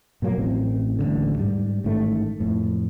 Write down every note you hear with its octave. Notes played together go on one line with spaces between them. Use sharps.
A#2 F3 F#3 A#3
A1 A2 C4
D#1 A1 D#2 D3
G#2 G3
A1 G#2 D#3 A3
F2 A2